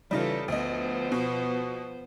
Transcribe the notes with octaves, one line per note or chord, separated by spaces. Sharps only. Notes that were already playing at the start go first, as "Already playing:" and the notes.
C#3 E3 G3 D#4 F4 A4
D2 F3 B3 C5 D#5
B2